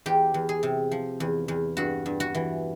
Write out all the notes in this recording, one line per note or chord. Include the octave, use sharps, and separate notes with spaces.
E2 G4
E2
G#4
C3
F3
E2
E2
G2 F#4
G2
F#4
E3